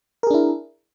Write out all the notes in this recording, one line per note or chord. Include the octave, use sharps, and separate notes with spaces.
D4 E4 G#4 A#4